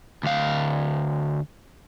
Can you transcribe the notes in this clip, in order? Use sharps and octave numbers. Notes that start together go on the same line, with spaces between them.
D2 F5